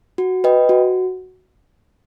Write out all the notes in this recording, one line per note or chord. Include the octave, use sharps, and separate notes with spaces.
F#4
B4 D#5 G5
F#4